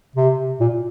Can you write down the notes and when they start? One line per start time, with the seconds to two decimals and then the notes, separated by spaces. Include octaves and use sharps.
0.15 C3
0.60 A#2